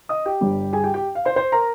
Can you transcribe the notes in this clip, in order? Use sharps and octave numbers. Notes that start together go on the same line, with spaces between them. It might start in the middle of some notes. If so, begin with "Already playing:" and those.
D#5 D#6
G4 G5
G1 G2 G3
G#4 G#5
G4 G5
G4 G5
F5
C5 C6
C5 C6
A#4 A#5